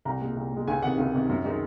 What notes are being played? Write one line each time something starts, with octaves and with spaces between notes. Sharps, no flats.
C2 A#5
A#2 G#3
C2
A#2 G#3
C#2 G#5
C3 D#3 F#5
C#2
C3 D#3
F#2
D#3 G#3 D#4